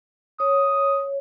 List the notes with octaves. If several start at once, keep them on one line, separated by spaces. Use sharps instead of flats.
C#5 D#6